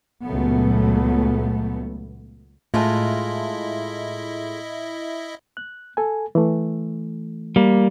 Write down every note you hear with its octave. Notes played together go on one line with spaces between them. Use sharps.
C#2 A#2 F#3 A3 B3
A2 G#3 A3 E4 F4 D#5 E5
F#6
A4 G#5
E3 A3
G3 A#3